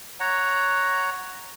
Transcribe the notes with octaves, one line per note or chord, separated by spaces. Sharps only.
C#5 F#5 A#5